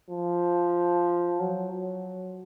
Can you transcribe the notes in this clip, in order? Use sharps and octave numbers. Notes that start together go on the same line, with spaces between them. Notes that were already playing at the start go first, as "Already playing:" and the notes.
F3
F#3
F#3